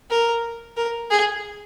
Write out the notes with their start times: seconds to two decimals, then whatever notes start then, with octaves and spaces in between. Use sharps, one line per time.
0.10 A#4
0.77 A#4
1.10 G#4